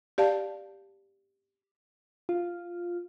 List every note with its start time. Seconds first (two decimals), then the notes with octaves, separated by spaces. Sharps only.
0.18 G4 D5 F5 A5
2.29 F4